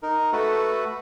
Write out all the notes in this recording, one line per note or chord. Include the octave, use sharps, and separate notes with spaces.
D#4 A#4
A3 F#4 A4 B4